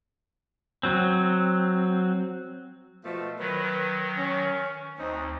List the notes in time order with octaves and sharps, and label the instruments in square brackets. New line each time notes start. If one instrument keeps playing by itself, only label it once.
[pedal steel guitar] F#3 C4
[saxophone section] B2 F3 A3
[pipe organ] D#3 F#3 [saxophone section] B4
[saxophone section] C#4
[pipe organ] D2 [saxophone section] C4 D#4